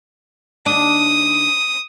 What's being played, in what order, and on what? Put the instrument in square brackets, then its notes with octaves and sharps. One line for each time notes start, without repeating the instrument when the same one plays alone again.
[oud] D#2 D4 [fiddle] D#6